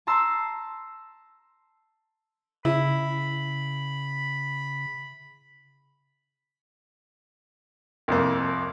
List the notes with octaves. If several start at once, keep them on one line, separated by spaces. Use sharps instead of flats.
A5 A#5 C6 E6
C#3 E4 B5
C2 F2 A#3